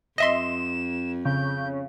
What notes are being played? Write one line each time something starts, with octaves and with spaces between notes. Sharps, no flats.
F2 D#5 E5 C6 E7
C#3 G6